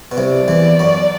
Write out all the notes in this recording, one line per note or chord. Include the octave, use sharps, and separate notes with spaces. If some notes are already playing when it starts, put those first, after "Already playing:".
B2
C2 C3 D5
E2 E3
F#2 F#3